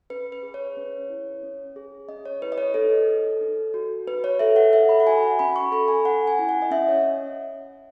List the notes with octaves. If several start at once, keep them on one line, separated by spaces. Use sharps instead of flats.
C#4 B4
B4
G#4
C#5
C#4
E4
C#4
G#4
C#4 D#5
C#5
E4 B4
D#5
C#5
D#4 A4
A4
D#4
F#4
D#4 B4
C#5
A4 E5
F#5
D#4 E5
B5
F#5
F#4 G#5
F#5
C#4 B5
C#6
A4 B5
G#5
C#4 F#5
G#5
E4
F#5
D#5
C#4 E5
C#5